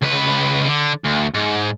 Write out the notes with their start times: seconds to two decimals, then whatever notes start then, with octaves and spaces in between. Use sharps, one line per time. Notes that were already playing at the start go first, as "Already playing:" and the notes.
0.02 C#2 B4
0.67 D3
1.05 D2
1.34 G#2